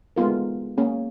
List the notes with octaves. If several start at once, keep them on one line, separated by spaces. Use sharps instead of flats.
G#3 A3 B3 F4 A#4
A#3 C#4 G#4